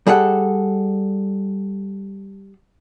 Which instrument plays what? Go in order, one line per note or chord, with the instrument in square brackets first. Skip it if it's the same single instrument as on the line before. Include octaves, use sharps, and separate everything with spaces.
[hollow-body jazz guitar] G3 G#4 A4 F#5